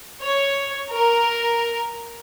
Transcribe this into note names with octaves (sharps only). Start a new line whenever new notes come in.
C#5
A#4